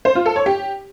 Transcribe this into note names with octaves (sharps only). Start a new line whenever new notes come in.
C5
F4
A4
C#5
G4